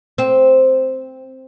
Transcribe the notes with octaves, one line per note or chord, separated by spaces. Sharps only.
C4